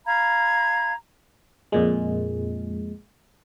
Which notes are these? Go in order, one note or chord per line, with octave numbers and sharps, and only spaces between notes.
F5 A#5 B5 G#6
F2 A#2 G#3